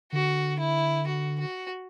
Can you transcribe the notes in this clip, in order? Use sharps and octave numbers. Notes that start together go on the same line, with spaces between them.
D3 F#4
E4
F#4
F#4